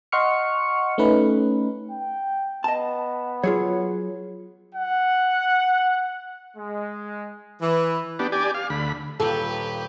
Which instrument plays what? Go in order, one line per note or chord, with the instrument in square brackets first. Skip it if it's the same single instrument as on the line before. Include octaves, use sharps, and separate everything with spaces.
[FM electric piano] D#5 F#5 C6 C#6 F6 C#7
A3 C#4 D#4 B4
[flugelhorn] G5
[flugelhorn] B3 [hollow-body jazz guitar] D#5 A5
[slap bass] F#3 [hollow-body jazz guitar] F4 G#4 C#5
[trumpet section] F#5
G#3
[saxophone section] E3
[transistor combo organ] B3 D4 G4
G4 D5 G#5
F5
D2 B5
[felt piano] D#1 F4 [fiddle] G4 B4 [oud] A4